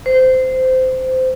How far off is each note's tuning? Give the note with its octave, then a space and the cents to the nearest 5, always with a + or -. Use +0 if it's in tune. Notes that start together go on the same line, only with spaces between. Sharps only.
C5 -20